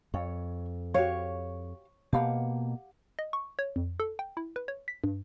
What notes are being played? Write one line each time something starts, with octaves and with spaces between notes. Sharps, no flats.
F2 C#5
F#4 G4 C#5 F5
B2 A#3 G4 F5 F#5
D#5
C#6
C#5
F2
A4
G5
E4
B4
C#5
B6
G2